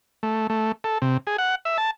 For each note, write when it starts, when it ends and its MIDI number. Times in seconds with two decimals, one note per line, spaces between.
0.23 0.47 57
0.50 0.72 57
0.84 0.98 69
1.02 1.17 48
1.27 1.37 68
1.38 1.55 78
1.65 1.78 76
1.78 1.91 81